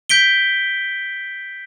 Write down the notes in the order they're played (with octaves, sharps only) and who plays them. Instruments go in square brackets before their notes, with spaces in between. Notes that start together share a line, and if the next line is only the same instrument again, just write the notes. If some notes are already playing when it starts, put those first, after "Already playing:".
[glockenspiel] G6 B6 D7 G7